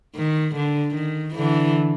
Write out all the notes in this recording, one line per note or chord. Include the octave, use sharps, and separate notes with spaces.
D#3
D3
D#3
D3 E3